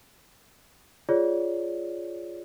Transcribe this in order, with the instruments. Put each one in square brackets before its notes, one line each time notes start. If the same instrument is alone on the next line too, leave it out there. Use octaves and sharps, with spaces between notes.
[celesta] F4 G#4 C#5 D5